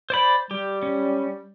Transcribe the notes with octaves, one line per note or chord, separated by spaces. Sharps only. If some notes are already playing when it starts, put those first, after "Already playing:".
C5 D5 B5
G3 G4
C#4